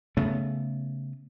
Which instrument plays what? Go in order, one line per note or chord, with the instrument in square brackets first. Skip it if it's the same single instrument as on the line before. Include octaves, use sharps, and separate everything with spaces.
[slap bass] C#3 A3 B3